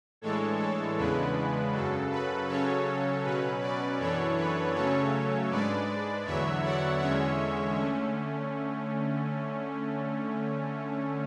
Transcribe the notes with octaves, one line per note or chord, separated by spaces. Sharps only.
A2 E3 G#3 D4 A4 C#5
A4
E2 C#3 G#3 B3 D4 B4
F#2 C#3 F#3 A4
B4
C#3 F#3 C#4 A4 C#5
B2 F#3 C#4 B4
B4 D5
F#2 E3 B3 D4 A4 C#5
B4
C#3 F#3 A3 C#4 A4 C#5
G#2 G#3 D4 B4 D5
E2 D3 F#3 B3 C#5 E5
D5 F#5
E2 D3 G#3 C#4 C#5 E5
D3 A3 C#4